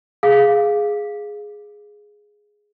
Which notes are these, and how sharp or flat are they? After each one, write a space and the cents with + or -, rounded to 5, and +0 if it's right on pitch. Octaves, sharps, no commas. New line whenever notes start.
G#4 +0 F5 +0